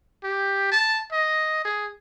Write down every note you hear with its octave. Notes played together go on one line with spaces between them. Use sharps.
G4
A5
D#5
G#4